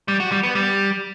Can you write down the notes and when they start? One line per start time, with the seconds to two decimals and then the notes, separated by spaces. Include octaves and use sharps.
0.08 G3
0.20 F#4
0.32 G3
0.43 B3
0.55 G3